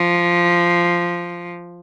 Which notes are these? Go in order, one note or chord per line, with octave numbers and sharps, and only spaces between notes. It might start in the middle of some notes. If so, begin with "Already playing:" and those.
Already playing: F3